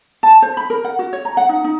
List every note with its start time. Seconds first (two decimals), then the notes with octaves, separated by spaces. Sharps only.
0.23 A5
0.42 C5
0.57 B5
0.70 A#4
0.84 F#5
0.99 F#4
1.13 C#5
1.25 A#5
1.37 F#5
1.49 D#4
1.64 D#4